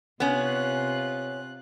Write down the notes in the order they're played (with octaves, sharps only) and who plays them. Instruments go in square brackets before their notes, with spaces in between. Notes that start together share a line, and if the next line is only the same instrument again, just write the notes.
[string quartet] C3 F4 F#6 [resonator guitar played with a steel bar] B3 C#4